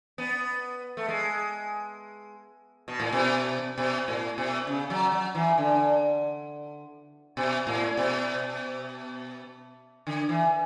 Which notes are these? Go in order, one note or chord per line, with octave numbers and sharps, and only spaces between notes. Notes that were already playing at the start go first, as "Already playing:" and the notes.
B3
A3
G#3
B2
A2
B2
B2
A2
B2
C#3
F#3
F#3
E3
D3
B2
A2
B2
D3
E3